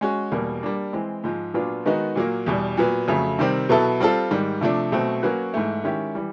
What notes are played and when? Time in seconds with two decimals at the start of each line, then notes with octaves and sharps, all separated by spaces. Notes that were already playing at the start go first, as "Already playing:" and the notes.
0.01 G#3 C#4 F#4
0.32 E2 B2 G3 A#3
0.63 G3 A#3 D4
0.93 E3 G#3 C4
1.24 G#2 F3 G#3
1.54 A#2 F#3 B3 D4 F4
1.86 D#3 G#3 B3 D#4 F#4
2.15 A#2 F#3 A#3
2.46 E2 B2 G3
2.77 A#2 F#3 B3
3.08 F2 C#3 F#3 A3
3.39 C3 D#3 G3 C4
3.69 B2 F#3 B3 E4 A4
4.00 G3 C4 F4 A4
4.31 G#2 D#3 G3
4.61 C3 F3 A3 D4
4.92 B2 F#3 A3 C4
5.23 F#3 A#3 C#4 F#4 B4
5.54 G#2 E3 A3
5.84 D#3 G#3 C#4 E4 G4
6.15 E3 G3